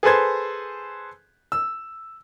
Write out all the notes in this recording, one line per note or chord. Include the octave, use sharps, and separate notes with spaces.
G#4 A4 B4 C5 G#6
E6